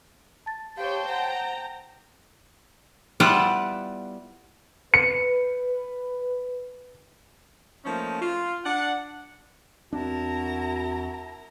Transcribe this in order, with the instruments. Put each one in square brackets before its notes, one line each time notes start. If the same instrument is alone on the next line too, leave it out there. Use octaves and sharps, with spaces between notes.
[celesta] A5 A6
[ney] G4 [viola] C5 C#5 [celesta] F5 [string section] G5 A5
[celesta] C5 [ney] F#5 [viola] A#5
[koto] G3 B3 E4 F4 D5 F#5
[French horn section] B4 [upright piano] C#7
[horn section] F3 A3 A#3 C#4 D#4
F4
D4 F#5
[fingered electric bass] E2 C4 D4 [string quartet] E4 A#4 A#5 [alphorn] F#4 [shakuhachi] A5